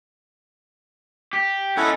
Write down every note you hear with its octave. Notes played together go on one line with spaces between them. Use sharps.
G4
C#4 D#4 E4 A4 F#5